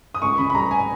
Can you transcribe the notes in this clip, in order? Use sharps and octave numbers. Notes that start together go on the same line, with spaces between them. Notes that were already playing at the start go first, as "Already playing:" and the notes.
D#6
C#2 C#6
C#3 B5
B5
G3 A#5
G#5